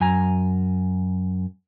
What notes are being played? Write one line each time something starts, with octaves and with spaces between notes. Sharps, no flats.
F#2 G#5 A#5